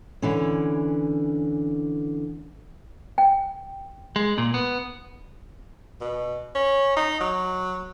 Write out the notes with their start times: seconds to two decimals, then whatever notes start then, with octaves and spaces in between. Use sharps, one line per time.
0.22 D3 E3 C#4
3.18 G5
4.16 G#3
4.38 A#2
4.54 B3
6.01 B2
6.55 C#4
6.97 D#4
7.20 F#3